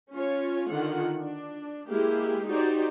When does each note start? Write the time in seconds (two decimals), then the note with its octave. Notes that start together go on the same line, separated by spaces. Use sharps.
0.14 C#4 F4 C#5
0.70 D3 D#3 F4 F#5
1.20 D4
1.87 G#3 A#3 E4 G4 G#4
2.48 D#4 F#4 G4 C5 D5